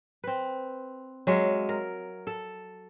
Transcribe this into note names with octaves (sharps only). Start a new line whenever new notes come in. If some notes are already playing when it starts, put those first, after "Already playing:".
C4 B4
F#3 G#3 E5 F5
A#4
A4